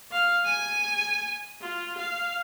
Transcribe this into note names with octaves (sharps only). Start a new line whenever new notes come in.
F5
G#5
F4
F5